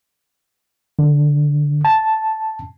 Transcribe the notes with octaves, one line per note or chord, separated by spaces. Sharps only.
D3
A5